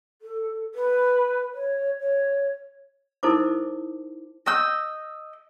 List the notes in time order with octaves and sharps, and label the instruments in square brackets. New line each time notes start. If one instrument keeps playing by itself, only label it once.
[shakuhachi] A4
B4
C#5
C#5
[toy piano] D#4 E4 A4 A#4 C5 D6
[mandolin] D#5 D#6 E6 G6